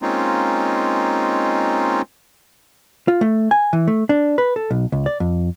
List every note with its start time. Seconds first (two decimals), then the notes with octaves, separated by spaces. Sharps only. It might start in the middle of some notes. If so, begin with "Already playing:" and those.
0.02 G#3 A#3 C4 C#4 D#4 F4
3.08 F4
3.21 A3
3.51 G#5
3.73 E3
3.88 A3
4.09 D4
4.38 B4
4.56 A4
4.71 B1
4.92 C#2
5.06 D5
5.20 F2